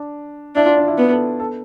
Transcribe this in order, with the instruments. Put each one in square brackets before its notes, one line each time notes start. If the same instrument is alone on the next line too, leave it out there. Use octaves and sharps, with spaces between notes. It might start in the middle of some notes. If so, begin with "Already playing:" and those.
Already playing: [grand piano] D4
[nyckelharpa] D4 [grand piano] E4
[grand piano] F4
D4
E4
[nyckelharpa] B3
[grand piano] A4
A4